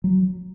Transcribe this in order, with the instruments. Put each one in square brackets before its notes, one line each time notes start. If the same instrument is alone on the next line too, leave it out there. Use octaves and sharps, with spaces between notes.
[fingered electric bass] F#3